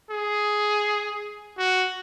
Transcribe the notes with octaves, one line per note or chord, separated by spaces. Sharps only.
G#4
F#4